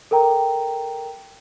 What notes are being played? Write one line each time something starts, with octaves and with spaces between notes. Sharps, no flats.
A4 A#4 G5 A#5